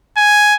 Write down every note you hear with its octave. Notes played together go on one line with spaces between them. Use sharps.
G#5